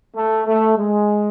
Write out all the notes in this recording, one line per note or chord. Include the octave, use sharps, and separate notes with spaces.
A3
A3
G#3